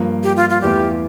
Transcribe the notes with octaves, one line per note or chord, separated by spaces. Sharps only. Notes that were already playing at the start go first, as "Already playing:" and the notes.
Already playing: G2 F3 A#3
G4
F4
F4
E2 E3 A3 G4